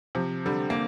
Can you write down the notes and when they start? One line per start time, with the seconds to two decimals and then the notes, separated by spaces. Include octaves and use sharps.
0.15 C3 F3
0.45 D3 G3
0.70 A#3